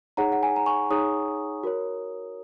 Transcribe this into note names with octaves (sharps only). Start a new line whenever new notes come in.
D#4 G#4 C#5 F#5 A#5
F#5
G#5
A#5
G#5 C#6
D#4 G#4 C#5 A#5 D#6
F#4 A#4 C#5